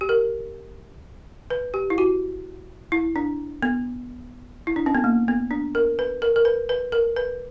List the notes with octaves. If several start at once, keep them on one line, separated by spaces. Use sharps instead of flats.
G4
A#4
B4
G4
E4
F#4
E4
D4
B3
E4
D4
C#4
B3
A#3
B3
D4
A#4
B4
A#4
A#4
B4
B4
A#4
B4